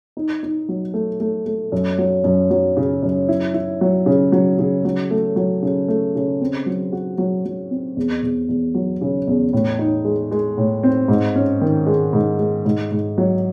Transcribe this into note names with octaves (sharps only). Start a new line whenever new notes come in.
D#4
D#4
F#3
A3
A3
A3
F#2
F#3
F#2
F#3
C#3
F#2
E4
E4
F#3
C#3
F#3
C#3
F#3
A3
F#3
C#3
A3
C#3
C4
F#3
F#4
F#3
F#3
C4
E2
E2
E2
F#3
C#3
E2
A2
D#4
G#3
G#3
A2
C4
G#2
C#4
D#3
G#3
G#2
G#3
G#2
G#2
F#3